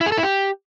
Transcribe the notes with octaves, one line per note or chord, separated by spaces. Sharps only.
E4
G#4
A4
E4
G4